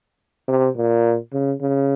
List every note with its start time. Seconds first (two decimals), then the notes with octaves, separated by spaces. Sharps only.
0.48 C3
0.76 A#2
1.33 C#3
1.61 C#3